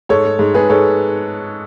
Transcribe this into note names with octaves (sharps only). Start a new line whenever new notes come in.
G#2 A4 C#5
G#2
G#2
G#2 G#4 B4
G#2 A4 C#5